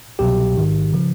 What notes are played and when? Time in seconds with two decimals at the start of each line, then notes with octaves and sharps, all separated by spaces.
0.19 C2 B2 F#3 G4
0.55 A1 G#2 D#3
0.93 C#3 F3